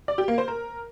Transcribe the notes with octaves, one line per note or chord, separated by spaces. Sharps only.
D5
G4
A#3
C5
A#4